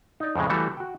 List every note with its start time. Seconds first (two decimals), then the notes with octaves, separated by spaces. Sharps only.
0.20 D#4 D5
0.36 F2 A2 C#3 G#3
0.50 E3 G3 A3 F#4 A4
0.77 F#4 G5